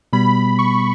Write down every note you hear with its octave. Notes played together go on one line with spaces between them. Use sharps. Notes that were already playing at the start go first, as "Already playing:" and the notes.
B2 G3 B3 B5
B5
C#6